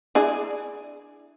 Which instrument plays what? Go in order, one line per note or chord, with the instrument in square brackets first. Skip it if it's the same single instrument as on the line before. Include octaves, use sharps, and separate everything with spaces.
[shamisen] D4 E4 G#4